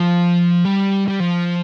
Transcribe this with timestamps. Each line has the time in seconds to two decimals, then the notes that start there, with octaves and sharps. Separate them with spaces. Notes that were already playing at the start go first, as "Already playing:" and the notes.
Already playing: F3
0.65 G3
1.08 G3
1.20 F3